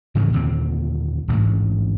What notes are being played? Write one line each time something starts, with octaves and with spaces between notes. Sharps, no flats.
G#2 C#3 E3 A3
D#2 A#2 D3 C4
D#1 A1 D2 G#2